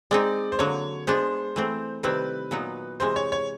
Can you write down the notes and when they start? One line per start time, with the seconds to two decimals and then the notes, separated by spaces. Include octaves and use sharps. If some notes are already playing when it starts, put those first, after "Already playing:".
0.11 G#3 C4 D#4 D5
0.52 C5
0.59 D3 F#3 A#3 C#5
1.07 G#3 B3 D4 C5
1.56 E3 A3 C4
2.03 C3 D#3 G3 C4 E4 B4
2.51 A#2 F#3 B3 D#4
3.00 C3 E3 G#3 C5
3.16 C#5
3.32 C#5